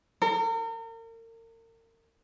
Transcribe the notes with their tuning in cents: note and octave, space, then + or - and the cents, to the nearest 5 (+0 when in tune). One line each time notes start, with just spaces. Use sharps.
A#4 -40